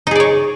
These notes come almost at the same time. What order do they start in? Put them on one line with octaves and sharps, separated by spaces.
D#4 G#4 D5 C#5